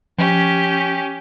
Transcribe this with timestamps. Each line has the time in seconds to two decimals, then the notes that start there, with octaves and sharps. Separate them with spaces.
0.18 F3 C#4 G4